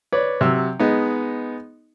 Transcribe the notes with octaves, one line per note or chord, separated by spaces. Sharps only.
B4 C#5 D5
C3 F#3 E6
G#3 B3 D#4